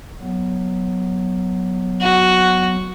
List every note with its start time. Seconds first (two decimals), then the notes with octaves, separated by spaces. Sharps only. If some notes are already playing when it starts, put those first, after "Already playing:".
0.21 F#3 B3
2.01 F#4